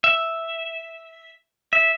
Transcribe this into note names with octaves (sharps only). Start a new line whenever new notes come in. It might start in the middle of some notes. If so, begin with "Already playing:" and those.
E5
E5